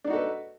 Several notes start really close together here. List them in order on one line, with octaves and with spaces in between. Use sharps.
D4 D#4 F#4 A4 B4